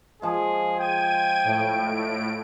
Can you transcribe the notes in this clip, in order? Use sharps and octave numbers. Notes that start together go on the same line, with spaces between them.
F3 G#3 G#4
G5 G#6 D#7
A2 D7